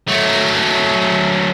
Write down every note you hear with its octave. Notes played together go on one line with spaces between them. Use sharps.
F#3 A3